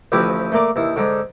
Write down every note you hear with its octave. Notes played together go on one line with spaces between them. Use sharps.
A1 D2 F3 E4 G4 B4
A3 A#3 D5
D#2 E3
G#2 D3